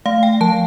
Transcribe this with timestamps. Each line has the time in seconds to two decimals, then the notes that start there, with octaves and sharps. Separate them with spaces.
0.06 A3 F5
0.23 G5
0.41 F3 A5